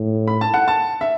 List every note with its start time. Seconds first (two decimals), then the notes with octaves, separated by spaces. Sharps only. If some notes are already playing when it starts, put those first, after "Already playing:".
Already playing: A2
0.27 B5
0.41 A5
0.54 F#5
0.68 A5
1.01 E5